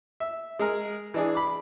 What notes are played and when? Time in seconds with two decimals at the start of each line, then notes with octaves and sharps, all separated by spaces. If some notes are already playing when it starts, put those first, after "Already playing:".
0.20 E5
0.59 G#3 G#4 A#4
1.14 E3 D4 G#4
1.35 B5 D6